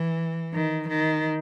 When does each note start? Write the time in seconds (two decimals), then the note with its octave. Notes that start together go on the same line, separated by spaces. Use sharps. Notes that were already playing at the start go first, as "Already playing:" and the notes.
Already playing: E3
0.54 D#3
0.88 D#3